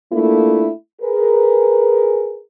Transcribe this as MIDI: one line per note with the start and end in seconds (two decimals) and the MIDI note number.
0.11 0.68 57
0.11 0.68 58
0.11 0.68 62
0.11 0.68 64
0.11 0.68 65
0.11 0.68 69
1.01 2.38 68
1.01 2.38 70
1.01 2.38 71